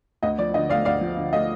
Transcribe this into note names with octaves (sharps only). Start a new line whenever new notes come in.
D2 D#5
F3 D5
D3 D#5
A3 D5 F5
D2 D5 F5
F3
D3
A3 D#5